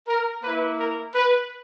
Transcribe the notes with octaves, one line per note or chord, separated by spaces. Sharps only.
A#4
A#3 E4 B4
A#4
B4